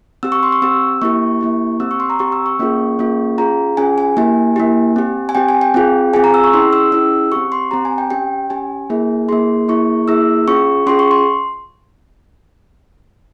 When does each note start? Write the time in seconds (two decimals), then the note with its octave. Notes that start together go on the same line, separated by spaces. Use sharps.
0.23 C4 G4 E6
0.32 C#6
0.43 C6
0.52 C#6
0.62 C4 G4 E6
1.02 A#3 E4 G4 C#6
1.41 A#3 E4 G4
1.80 C4 G4 E6
1.91 C#6
2.00 C6
2.10 A#5
2.19 C4 G4 C#6
2.32 E6
2.46 C#6
2.59 A#3 C#4 F4 G#4
2.99 A#3 C#4 F4 G#4
3.38 C#4 F4 G#4 A#5
3.77 C#4 F4 G#4 G#5
3.98 G#5
4.17 A#3 E4 G4 G#5
4.56 A#3 E4 G4
4.96 C4 G4
5.29 G#5
5.35 C4 G4 G5
5.49 G#5
5.61 G5
5.74 C4 F4 G#4
6.13 C4 F4 G#4 G#5
6.24 A#5
6.34 E6
6.44 C#6
6.53 C#4 E4 G#4 C6
6.73 E6
6.92 C#4 E4 G#4 E6
7.32 C4 G4 C#6
7.52 C6
7.71 C4 G4 A#5
7.85 G#5
7.98 G5
8.10 C#4 G4 G5
8.50 C#4 G4 G#5
8.90 A#3 E4 G#4
9.29 A#3 E4 G#4 C6
9.68 A#3 E4 G#4 C#6
10.08 A#3 E4 G#4 E6
10.48 C#4 F4 G#4 C#6
10.87 C#4 F4 G#4 C6
10.99 C#6
11.11 C6